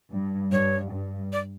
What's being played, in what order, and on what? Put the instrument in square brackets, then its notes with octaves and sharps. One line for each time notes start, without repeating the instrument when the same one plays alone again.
[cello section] G2
[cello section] G2 [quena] C#5
[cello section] G2
[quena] D5